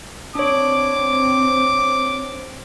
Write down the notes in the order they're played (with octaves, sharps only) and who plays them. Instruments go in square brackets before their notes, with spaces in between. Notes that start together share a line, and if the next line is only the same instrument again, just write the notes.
[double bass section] C4 [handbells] D4 C#5 [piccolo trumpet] D6